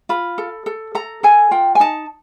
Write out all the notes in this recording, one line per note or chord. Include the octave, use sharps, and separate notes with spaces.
F4 B5
A4
A4
A4 A#5
A4 G#5
F4 G5
G#5
D#4 A5